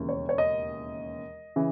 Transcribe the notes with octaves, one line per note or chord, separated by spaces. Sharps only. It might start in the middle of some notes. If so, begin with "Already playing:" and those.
Already playing: E1 D#2 C#3 E3
C#5
C#5
D#5
C#3 E3